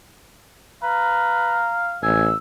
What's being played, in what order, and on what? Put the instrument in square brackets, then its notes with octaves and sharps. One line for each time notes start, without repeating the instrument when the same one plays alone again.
[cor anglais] B4 [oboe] F5 [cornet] A#5
[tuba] A1 [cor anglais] G#5 [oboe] E6